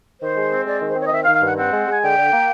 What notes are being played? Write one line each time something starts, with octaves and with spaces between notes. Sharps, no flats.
D#3 C5
G#3
C4
G#3 D5
D#3
C5
C4 C#5
D#5
D#3 E5
F5
D#3
F5
G2 F#5
C4 F#5
G#3
G#3 G#5
D3 G5
D3
A#3